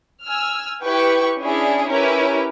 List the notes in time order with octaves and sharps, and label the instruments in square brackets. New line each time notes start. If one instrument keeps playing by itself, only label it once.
[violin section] G#5 E6 F6
E4 G4 B4 G5 C#6
C#4 D4 E4 G#4
C#4 E4 G4 A#4 B4